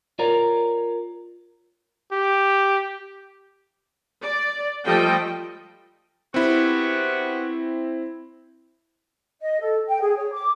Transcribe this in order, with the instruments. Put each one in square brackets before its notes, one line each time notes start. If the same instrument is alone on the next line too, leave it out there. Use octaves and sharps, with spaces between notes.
[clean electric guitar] F4 A#4 C#5 D5 A#5
[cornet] G4
[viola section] D5
F3 G3 A3 A4 D#5 G5
[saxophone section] B3 F#4 G4 [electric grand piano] C4 E4
[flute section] D#5
A4
G5
G#4
C#5
D6